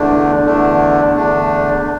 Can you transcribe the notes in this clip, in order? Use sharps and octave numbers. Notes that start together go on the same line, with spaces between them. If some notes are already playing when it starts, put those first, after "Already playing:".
Already playing: E2 D3 A3 D4
E2 D3 A3 D4
E2 D3 A3 D4